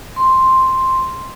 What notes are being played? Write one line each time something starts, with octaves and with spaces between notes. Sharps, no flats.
C6